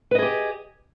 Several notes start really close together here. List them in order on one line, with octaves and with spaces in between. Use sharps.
B4 D#5 G#4 G4